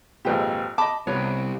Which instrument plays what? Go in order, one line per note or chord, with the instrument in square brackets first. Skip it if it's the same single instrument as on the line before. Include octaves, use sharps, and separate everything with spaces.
[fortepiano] G#1 F2 A#2 [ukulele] G4 B4
[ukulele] D#5 A5 [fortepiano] B5 D6
[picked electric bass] C2 C3 [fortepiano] B3 [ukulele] C#5